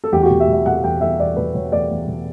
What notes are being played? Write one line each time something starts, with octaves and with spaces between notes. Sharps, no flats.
A4
E2 G4
F#4
B2 G4
E5
B2
E5
B2 F#5
E2 G5
E2 E5
E2 D5
B2 B4
B2 C#5
E2 D5
E2
B2